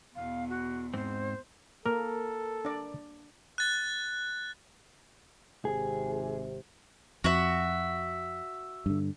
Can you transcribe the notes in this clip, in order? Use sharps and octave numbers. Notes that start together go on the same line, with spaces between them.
E2 B2 F5
F#4
G#2 C4 C5
A#3 A4 A#4
D4 D5
F#6 A6
G#1 C3 G#4
F2 F#4 E5
G2 D3